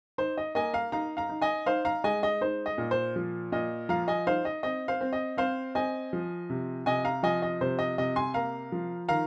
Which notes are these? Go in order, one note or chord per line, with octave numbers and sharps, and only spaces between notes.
D#4 C5
D#5
A#3 D#5 G#5
F5 A#5
D#4 F5 A#5
F5 A#5
D#4
D#5 G#5
D#4 C5 F5
F5 A#5
G#3 D#5 G#5
D#5
D#4 C5
D#5
A#2
C5
F3
A#2 D#5
F3 F5 A#5
D#5 G#5
D#4 C5 F5
D#5
C4 D#5
C5 F5
C4
D#5
C4 C5 F5
C4 D#5 G#5
F3
C3
C3 D#5 G#5
F5 A#5
F3 D#5 G#5
D#5
C3 C5
D#5
C3 D#5
G#5 C6
A#3 F5 A#5
F3
D#3 F5 A#5